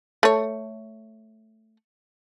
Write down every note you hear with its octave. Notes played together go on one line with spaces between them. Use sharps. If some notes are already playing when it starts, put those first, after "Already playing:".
A3 C#5